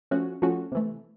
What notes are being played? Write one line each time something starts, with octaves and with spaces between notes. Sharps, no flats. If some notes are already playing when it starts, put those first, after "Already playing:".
F3 A3 C#4 F#4
F3 A3 C#4 F#4
C3 E3 A3